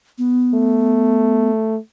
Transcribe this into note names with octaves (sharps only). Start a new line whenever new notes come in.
B3
A3